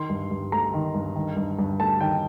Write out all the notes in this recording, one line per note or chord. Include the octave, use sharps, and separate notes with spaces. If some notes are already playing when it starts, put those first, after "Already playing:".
Already playing: D#3 C6
G2
G2
A3 A#5
D#3
G2
D#3
G2
G2
A3 A5
D#3 G5